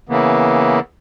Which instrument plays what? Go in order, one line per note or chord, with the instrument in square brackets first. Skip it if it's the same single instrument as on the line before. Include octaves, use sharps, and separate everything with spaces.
[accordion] C#3 E3 A#3 B3